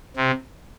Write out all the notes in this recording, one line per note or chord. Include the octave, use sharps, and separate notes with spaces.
C3